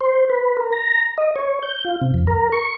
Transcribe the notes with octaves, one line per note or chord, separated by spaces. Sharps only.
C5
B4
A#4
A#5
D#5
C#5
G6
F4
C3
F2
A#4
C#6